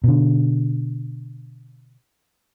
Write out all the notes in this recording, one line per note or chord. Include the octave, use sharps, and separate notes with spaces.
B2 D3